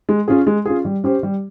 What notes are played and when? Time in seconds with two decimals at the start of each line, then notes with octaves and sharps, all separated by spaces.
0.09 G#3
0.28 C#4 F4 G#4
0.47 G#3
0.65 C#4 F4 G#4
0.85 G3
1.04 C#4 G4 C5
1.23 G3